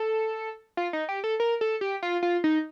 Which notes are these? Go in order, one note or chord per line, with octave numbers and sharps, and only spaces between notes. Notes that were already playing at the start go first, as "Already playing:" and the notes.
Already playing: A4
F4
D#4
G4
A4
A#4
A4
G4
F4
F4
D#4